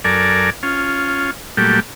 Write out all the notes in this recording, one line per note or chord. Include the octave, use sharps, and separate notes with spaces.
F#2 A4 A#4 D5 G#5
C#4 F4
A#2 F#3 G3 A3 G4